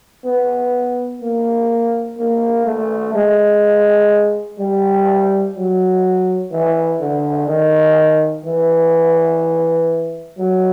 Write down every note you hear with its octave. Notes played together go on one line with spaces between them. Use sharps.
B3
A#3
A#3
A3
G#3
G3
F#3
E3
D3
D#3
E3
F#3